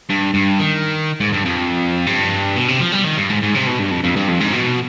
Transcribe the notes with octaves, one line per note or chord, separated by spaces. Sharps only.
G2
G2
D#3
G#2
G2
F2
G2
B2
C3
F3
G3
D#3
G2
G#2
G#2
C3
B2
G2
F2
F2
G2
F2
G#2
B2